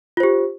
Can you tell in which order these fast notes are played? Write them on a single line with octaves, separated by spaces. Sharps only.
F4 C5 G4